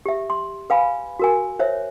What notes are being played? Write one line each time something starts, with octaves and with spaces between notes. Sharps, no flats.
G4 E5
C6
B4 F5 G#5 B5
F#4 A#4 G#5
C5 C#5 E5